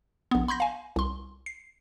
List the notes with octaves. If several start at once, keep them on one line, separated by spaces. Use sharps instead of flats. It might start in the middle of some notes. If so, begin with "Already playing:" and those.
A#1 B3
B5 C6 G6 A#6
F5 G#5
C2 C6
C7